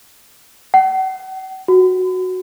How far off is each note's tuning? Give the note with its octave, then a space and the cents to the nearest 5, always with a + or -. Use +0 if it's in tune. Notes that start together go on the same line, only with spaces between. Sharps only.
F#5 +40
F#4 -5